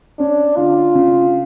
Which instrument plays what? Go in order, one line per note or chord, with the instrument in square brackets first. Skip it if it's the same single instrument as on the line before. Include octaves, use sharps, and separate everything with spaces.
[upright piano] C#4 [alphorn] D4
[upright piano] D3 [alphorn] F4
[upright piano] C#3